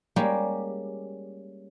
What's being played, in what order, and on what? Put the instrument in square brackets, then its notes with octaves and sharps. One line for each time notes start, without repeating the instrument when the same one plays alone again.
[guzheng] G3 G#3 A#3 C#4 G4